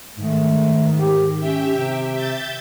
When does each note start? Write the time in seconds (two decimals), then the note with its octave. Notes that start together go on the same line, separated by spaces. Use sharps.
0.16 G#2 D#3 A3
0.99 G4
1.39 C#4 G4 E5 G5
1.76 C3
2.13 E5 G6 A6